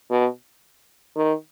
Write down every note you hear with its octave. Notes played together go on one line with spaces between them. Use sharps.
B2
D#3